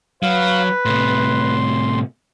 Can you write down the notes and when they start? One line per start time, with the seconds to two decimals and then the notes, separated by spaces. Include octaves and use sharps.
0.23 F#3 B4 F5
0.85 A2 C3 C6